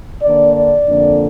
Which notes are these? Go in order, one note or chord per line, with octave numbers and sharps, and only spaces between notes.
D3 A#3 D4 D5
D5
F2 D3 A#3 D4